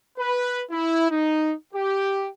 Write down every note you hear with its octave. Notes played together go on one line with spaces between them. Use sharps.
B4
E4
D#4
G4